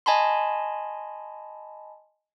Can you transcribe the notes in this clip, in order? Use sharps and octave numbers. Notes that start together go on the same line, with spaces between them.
D#5 G#5 A5 B5 C6